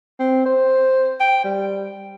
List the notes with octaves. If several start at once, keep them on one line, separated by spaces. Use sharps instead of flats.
C4
C5
G5
G3